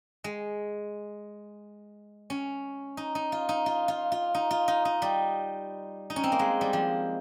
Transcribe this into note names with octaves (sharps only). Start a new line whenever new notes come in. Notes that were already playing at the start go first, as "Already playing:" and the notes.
G#3
C#4
D#4
D#4
F4
D#4
F4
F4
F4
D#4
F4
D#4
D#4
G3
D#4
C#4
C4
A#3
G#3
G3
F3